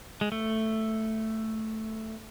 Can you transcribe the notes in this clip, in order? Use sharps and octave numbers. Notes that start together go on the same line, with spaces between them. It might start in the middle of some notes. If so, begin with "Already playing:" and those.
G#3
A3